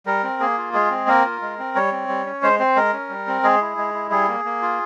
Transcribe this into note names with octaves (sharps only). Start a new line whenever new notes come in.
G3 A#4
C4
A#3 G#4
F4
G#3 G#4
C4
A#3 A#4
F4
G#3
C4
G3 C#5
C4
G3
C#4
G#3 C5
C4 C5
G#3 A#4
C#4
G3
C4
G#3 G#4
E4
G#3
E4
G3 G#4
A#3
A#3
F4